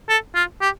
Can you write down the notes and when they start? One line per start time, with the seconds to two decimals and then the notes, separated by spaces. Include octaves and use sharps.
0.09 A4
0.35 F4
0.61 G4